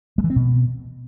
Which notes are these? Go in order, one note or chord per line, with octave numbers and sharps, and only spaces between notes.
G#3
E3
C4
B2